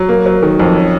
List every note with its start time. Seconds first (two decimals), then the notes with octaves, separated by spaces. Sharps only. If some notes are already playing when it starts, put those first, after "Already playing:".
Already playing: F#3
0.09 A#3
0.26 F#3
0.43 D#3
0.60 F2
0.76 C#4